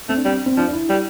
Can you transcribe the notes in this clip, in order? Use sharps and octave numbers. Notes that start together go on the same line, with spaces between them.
A3 C4
D4
G3 C4
C4
F3 D4
D4
E4
G3